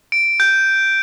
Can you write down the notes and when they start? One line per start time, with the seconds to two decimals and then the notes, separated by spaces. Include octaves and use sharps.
0.12 D7
0.40 G6